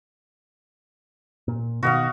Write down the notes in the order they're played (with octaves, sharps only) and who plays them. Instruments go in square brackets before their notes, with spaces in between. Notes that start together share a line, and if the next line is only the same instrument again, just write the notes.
[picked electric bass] A#2
[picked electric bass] B2 D3 D#3 [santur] F#4 D#5 F5